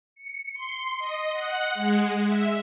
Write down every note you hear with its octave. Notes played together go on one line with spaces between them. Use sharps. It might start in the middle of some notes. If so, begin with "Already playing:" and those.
C#7
C6
D#5
F#5
G#3
E5